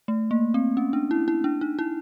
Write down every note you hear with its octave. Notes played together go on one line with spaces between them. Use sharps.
A3
A#3
C4
C#4
D4
E4
E4
D4
D#4
E4